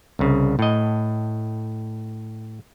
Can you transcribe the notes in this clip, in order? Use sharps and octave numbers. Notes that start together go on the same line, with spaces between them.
C2 C#3
A2 D#5